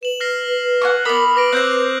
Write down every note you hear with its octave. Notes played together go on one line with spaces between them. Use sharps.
B4 E7 F#7
F6 A#6 C7
F#5 G#5 C#6
B3 A#4 B5 D6 D#6 F#7
B4 D6 A#6 D7
C4 C5 F#6 G6